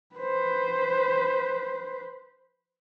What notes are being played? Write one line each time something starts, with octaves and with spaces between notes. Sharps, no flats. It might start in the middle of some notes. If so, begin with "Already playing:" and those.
B4 C5